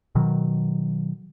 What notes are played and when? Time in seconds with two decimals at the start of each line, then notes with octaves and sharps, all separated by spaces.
0.15 B2 D#3 F#3